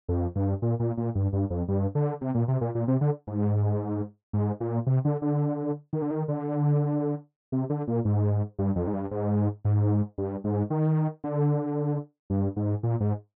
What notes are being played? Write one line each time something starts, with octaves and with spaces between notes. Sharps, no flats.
F2
G2
A#2
A#2
A#2
G2
G2
F2
G2
D3
C3
A#2
C3
A#2
A#2
C3
D3
G#2
G#2
A#2
C3
D3
D3
D#3
D3
D#3
D3
C3
D3
A#2
G#2
G2
F2
G#2
G2
G#2
G#2
G2
G#2
D#3
D3
G2
G#2
A#2
G#2